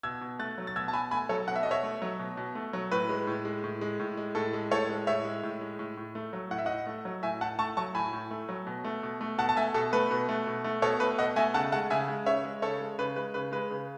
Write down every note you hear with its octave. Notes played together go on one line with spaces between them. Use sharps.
B2 E6 G#6
B2
A3 F#6 A6
F#3
A6
B2 E6 G#6
A5
B2 G#5 B5
A3 G#5 B5
F#3 A4 C#5
B2 F#5
E5
B2 D#5
C#5 E5
A3
F#3
B2
B2
A3
F#3
A2 B4
G#3
A2
G#3
A2
G#3
A2
G#3
A2 A4
G#3
A2 A4 C#5
G#3
A2 C#5 E5
G#3
A2
G#3
A2
A2
A3
F#3
A2 F#5
E5
A2 D#5 F#5
A3
F#3
A2 E5 G#5
A2 F#5 A5
A3 A5 C#6
F#3 A5 C#6
A2 G#5 B5
A2
A3
F#3
B2
A3
B2
A3
B2 F#5 A5
A5
A3 E5 G#5
B2 A4
A3 B4
B2
A3
B2
A3
B2 A4 C#5
A3 B4
B2 D#5 F#5
A3 E5 G#5
C#3 F#5 A5
G#3 F#5 A5
C#3 E5 G#5
G#3
C#3 C#5 E5
G#3
C#3 A4 C#5
G#3
C#3 B4
G#3 B4
C#3 B4
G#3 B4
C#3